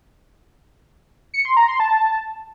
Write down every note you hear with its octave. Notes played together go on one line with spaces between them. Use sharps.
C#7
C6
A#5
C6
A5